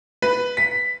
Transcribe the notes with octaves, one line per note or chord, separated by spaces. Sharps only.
B4
B6